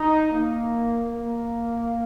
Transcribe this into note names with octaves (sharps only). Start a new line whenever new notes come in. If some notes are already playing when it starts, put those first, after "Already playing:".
Already playing: D#4
A#3
A#3